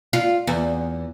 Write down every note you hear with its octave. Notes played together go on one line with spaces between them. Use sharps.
F4
E2